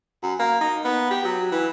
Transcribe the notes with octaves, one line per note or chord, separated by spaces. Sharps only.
F#2
A#3
D#4
B3
G4
F#3
E3